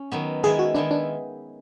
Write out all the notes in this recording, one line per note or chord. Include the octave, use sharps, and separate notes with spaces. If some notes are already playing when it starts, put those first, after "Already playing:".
Already playing: C#4
D#3 F#3 B3
D#3 G#3 B3 E4 G#4
F#4
D#3 G#3 B3 D4 E4
D4